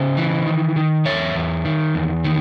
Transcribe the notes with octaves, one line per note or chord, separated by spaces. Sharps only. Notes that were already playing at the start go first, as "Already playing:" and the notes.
Already playing: C#3 C5 D#5
E3
D#3
D#3
E2 C#5 E5
E2
D#3
E2
D#3